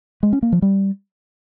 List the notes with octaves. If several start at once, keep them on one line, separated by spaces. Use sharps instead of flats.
G#3
C#4
A#3
F3
G3